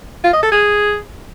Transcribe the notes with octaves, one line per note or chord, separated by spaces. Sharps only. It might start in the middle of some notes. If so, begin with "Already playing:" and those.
F4
D#5
A4
G#4